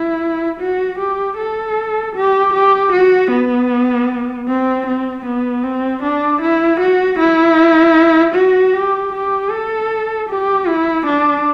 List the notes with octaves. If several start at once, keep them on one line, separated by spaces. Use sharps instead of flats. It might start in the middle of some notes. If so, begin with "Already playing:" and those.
Already playing: E4
F#4
G4
A4
G4
G4
F#4
B3
C4
C4
B3
C4
D4
E4
F#4
E4
F#4
G4
G4
A4
G4
E4
D4